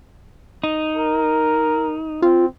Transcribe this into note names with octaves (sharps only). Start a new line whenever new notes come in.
D#4
A#4
C4 F4